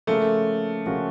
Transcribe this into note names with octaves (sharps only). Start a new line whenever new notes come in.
C#3 F3 A3 A#3 C#4 F#4
C#3 F3 A#3 C#4 F#4